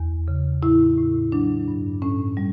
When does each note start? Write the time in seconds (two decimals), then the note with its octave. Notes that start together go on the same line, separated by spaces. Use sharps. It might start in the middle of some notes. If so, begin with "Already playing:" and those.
Already playing: E2
0.28 C#3
0.62 A2 E4
0.98 A2
1.32 F#3 D4
1.68 G2
2.02 A2 C#4
2.37 G3